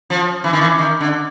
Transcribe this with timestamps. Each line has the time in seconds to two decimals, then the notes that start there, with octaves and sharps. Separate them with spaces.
0.10 F3
0.44 E3
0.53 D#3
0.61 E3
0.79 D#3
1.00 D3